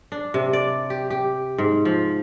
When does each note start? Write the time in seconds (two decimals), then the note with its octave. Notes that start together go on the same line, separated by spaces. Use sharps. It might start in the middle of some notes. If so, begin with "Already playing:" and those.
0.12 D4
0.34 C3
0.53 D5
0.90 G4
1.10 G4
1.58 G#2
1.85 F3